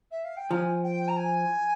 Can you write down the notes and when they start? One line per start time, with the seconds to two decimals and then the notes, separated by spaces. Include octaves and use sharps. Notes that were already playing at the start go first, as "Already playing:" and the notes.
0.11 E5
0.24 F5
0.37 G5
0.51 F3 G#5 A#5
0.83 G5
1.08 A#5
1.17 G#5